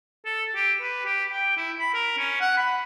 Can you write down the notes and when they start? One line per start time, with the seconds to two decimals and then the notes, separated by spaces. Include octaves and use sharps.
0.25 A4
0.55 G4
0.81 B4
1.05 G4
1.31 G5
1.57 E4
1.80 B5
1.94 A#4
2.18 C#4
2.41 F#5
2.57 B5